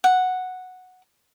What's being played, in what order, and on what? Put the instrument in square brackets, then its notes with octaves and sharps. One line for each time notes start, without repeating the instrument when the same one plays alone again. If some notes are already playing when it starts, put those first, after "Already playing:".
[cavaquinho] F#5